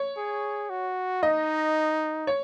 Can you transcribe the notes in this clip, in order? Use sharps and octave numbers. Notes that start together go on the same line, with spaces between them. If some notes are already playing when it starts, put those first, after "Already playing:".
Already playing: C#5
G#4
F#4
D#4 D#5
C#5